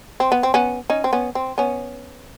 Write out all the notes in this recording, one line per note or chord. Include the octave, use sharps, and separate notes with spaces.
C4
B3
C4
B3 C#4
C#4 D#4
C4
B3 C#4
C4
B3 C#4